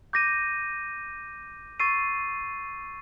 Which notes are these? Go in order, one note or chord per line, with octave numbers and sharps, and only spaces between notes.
D6 G6 A#6 D#7
C#6 E6 A6 C7 D#7